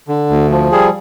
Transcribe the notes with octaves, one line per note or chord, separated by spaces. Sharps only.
D3
D2
F3
G3 G#4